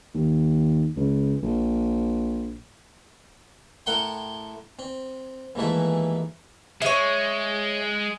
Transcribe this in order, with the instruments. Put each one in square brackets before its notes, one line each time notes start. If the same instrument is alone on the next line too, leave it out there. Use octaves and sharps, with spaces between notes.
[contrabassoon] D#2
C#2
A#1
[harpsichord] A2 A#4 F#5 G5 C6
C4
D#2 G#2 E3 A3 E5
[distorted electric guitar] G#3 [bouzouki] C#5 E5